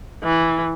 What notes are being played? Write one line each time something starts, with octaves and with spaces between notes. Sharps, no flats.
E3